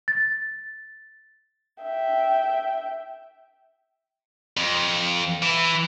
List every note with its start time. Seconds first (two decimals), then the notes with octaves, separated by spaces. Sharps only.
0.08 A6
1.82 E5 G5
4.57 F2
5.42 E3 E4